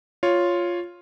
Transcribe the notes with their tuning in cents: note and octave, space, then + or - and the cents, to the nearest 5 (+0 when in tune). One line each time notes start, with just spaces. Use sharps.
F4 +0 C#5 +0